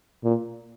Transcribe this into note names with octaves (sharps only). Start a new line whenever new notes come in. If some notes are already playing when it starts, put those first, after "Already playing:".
A#2